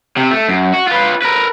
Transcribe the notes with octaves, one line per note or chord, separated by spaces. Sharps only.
C3
A3
F#2
F#4
F4 B4
A#4 B4